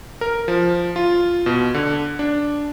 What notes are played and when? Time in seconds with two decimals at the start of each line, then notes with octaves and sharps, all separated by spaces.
0.21 A#4
0.48 F3
0.96 F4
1.46 B2
1.74 D3
2.19 D4